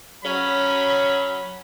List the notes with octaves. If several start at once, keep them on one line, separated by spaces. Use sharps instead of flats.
F#3 C#4 B5